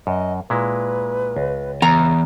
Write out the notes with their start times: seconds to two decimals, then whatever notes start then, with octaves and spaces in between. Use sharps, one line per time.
0.07 F#2 D#5
0.50 A#2 G#3 E4 B4
1.37 C#2
1.82 E2 A#5